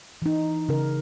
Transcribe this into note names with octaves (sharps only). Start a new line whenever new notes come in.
E3 D#4
C#3 A#4